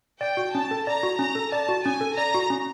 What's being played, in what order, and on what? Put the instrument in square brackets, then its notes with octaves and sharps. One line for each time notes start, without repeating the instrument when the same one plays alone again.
[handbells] D5 [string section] G5
[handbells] F#4
[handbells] C#4 [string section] A5
[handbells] A4
[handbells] D5 [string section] A#5
[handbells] F#4
[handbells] C#4 [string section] A#5
[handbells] A4
[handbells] D5 [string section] A5
[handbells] F#4
[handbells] C#4 [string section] G#5
[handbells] A4
[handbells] D5 [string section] A#5
[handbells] F#4
C#4